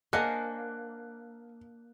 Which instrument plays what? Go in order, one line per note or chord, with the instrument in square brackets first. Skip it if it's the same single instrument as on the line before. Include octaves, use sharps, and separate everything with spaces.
[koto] A#3 [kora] D4 C5 F5 [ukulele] D#5 F#5 G#5 [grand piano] F#6